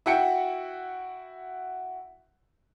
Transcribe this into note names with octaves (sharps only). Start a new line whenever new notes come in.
E4 F#4 G5 C#7